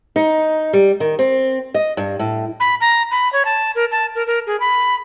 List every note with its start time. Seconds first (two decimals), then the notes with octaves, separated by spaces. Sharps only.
0.16 D#4
0.73 G3
1.00 D#3
1.19 C4
1.74 D#5
1.97 G2
2.19 A2
2.60 B5
2.81 A#5
3.11 B5
3.33 C#5
3.45 A5
3.75 A#4
3.92 A5
4.15 A#4
4.27 A#4
4.47 G#4
4.60 B5